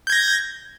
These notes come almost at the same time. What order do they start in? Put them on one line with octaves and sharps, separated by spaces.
G6 G#6 A#6